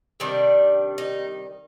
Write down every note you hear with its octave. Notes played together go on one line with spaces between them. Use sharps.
C3 D#3 G3 D4
D#4